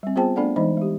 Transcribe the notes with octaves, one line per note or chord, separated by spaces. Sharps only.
G3 C4
B3 F4 G#4 C5 G5 A5
A3 B3 D4 A4 D5 F#5
E3 G#3 D#4 C5 D#5 B5
G#3 G4